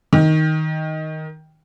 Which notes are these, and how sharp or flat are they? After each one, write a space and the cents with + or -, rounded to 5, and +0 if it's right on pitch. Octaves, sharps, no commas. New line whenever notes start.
D#3 +10